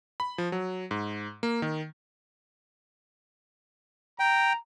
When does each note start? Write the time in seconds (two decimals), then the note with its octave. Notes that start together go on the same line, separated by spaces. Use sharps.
0.20 B5
0.38 F3
0.52 F#3
0.91 G#2
1.43 A#3
1.62 D#3
4.19 G5 A#5